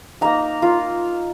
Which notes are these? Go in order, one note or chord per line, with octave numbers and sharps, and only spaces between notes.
A#3 D#4 A#5
A#3 F4